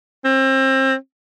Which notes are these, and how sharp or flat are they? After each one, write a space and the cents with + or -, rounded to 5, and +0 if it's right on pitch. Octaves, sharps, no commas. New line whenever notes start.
C4 +30